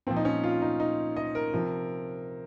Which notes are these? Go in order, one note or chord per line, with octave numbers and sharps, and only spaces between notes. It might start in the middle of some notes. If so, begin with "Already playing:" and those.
A#2 F3 C4
D#4
C#4
F4
D#4
D#4
D#5
A#4
C3 F3